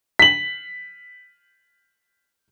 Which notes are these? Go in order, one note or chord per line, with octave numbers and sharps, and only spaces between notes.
B6 F#7